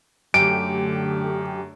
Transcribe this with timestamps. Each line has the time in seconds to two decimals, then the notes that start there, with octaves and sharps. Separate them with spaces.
0.34 F#2 D3 A3 G4 D7